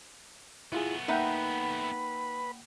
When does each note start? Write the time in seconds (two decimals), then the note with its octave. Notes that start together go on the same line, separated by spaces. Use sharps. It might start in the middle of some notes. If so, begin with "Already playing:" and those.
0.72 A3 B3 E4 F4 G#4
1.08 A#3 D#4 B4 E5 F#5 G5